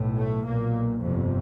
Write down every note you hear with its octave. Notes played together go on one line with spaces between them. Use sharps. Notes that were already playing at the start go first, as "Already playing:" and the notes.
Already playing: B1 A2
A3
B1 A#2 A#3
G1 F2 C3